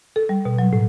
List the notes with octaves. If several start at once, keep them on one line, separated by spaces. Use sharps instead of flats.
A4
G3
B2
F#3
A2